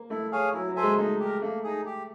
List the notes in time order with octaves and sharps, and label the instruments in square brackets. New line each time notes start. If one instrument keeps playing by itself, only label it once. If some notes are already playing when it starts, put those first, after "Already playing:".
Already playing: [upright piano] A#3
[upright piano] A3 [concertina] E4
[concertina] G#4 C#5 F5 G#5
[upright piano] F#3 [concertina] E4
[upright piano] F#3
[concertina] A4 C5 E5 G#5
[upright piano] G#3
[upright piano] A3 [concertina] D#4
[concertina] G4 A#4
[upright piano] A3 [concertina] A#3
[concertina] D#4 G#4
G4